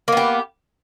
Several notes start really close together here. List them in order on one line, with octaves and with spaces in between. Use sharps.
A#3 B3 G4